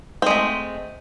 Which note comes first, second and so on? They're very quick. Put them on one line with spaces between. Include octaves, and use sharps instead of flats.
C4 G#3 A3